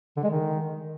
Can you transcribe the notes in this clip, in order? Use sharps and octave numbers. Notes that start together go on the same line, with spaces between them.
D3
G#3
D#3